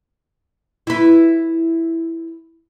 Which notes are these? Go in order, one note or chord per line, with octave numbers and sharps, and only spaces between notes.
E4 B4